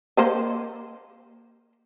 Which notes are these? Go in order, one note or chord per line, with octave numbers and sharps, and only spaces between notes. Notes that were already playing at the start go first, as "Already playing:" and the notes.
A#3 C5 D#5